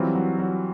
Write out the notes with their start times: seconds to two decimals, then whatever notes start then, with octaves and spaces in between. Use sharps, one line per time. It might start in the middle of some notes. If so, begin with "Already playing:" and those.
Already playing: E3 F#3 G3 C4 F4 F#4
0.15 F#3 F#4
0.39 F#3 F#4